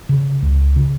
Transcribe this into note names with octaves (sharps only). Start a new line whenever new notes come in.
C#3
C#2
C#3